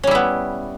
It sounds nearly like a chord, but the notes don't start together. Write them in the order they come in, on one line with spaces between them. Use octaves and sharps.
C#4 G3 E4 B3